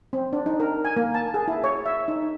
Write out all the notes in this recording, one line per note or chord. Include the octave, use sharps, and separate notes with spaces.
C4
D4
D#4
A#4
G#5
A#3
A5
G#4
E4
C#5
E5
D#4